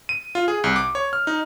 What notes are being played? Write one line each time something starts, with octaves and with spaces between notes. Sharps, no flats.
D#7
F4
G#4
C2
D6
C#5
F6
D#4